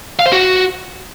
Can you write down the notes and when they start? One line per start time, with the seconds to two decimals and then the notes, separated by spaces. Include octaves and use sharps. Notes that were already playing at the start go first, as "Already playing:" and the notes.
0.19 F5
0.26 C5
0.32 F#4